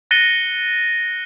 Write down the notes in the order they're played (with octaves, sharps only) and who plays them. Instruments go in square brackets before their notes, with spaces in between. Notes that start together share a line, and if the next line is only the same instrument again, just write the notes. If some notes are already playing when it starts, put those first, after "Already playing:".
[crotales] F#6 A6 A#6 C#7 D#7 G7